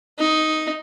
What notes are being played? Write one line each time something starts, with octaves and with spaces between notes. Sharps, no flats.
D#4